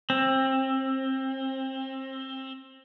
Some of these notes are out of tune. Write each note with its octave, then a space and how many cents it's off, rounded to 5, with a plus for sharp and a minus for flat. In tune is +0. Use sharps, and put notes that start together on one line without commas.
C4 +25